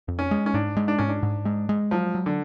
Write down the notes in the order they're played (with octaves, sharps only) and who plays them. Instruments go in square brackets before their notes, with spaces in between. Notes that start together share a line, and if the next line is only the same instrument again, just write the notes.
[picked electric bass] F2
[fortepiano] C#4
[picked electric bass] G#3
[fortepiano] C#4
[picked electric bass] G#2 [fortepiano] D4
[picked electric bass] G#3
[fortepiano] D4
[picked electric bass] G#2 [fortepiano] C#4
[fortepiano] D4
[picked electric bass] G#2
G#3
G#3
[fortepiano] F3 [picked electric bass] F#3
[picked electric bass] F#3
[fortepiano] D3